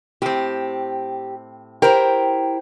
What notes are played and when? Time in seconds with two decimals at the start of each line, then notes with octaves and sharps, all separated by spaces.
0.22 A2 C4 G4
1.82 E4 G4 A#4 C5 G5